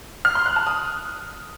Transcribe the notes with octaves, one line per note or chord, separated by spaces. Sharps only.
F6
C6
F#6
A5
D#6